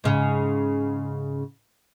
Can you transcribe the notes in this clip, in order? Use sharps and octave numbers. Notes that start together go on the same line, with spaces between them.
G#2 C#3